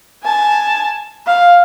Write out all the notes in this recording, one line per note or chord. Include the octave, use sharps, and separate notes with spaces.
G#5 A5
F5